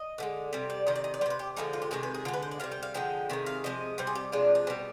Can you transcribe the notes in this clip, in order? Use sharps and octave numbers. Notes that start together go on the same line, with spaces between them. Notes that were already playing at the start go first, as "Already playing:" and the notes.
Already playing: D#5
D3 F3 G#3
C3 G3
D5
C3 D#3 D#5
D5
D#5
D5
G3 C5
C3 B4
G4
D3 F3 G#3 D#4
F4
G4
C3 D#3 G#3 G#4
B4
G#4
D3 G#3 F4
B4
C5
D5
C3 G3 F5
G5
F5
D3 F3 G#3 G5
C3 D#3 G#3
F5
C3 F3 G#3 D#5
C3 G3 C5
G#4
G4
C3 F3 G#3 D4
D4
B2 G3 C4